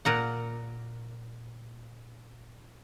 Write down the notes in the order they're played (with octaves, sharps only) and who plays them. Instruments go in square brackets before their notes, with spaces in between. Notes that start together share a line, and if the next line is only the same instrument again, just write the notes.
[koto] A#2 A#4 F#5